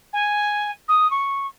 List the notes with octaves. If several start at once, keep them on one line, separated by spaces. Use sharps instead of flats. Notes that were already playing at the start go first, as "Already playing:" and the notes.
G#5
D#6
C#6